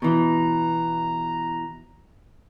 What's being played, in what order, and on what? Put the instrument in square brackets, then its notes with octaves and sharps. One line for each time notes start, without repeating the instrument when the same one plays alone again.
[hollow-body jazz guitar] B2 E3 [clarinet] A#5